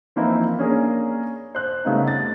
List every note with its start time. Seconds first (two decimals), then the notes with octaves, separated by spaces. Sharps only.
0.16 E3 F3 A#3 C4 D#4 E4
0.59 A#3 C#4 D4 G#4 A#4
1.55 C5 F#6
1.85 C#3 G3 A3 B3 C4 D#4
2.08 A6